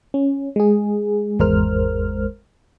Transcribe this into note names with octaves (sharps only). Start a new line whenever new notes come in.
C#4
G#3 G#4
G#1 E2 G#3 A#4 C5 F6